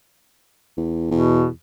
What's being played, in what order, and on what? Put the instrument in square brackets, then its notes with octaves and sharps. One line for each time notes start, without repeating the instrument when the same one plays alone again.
[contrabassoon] E2
[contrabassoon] E2 [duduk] B2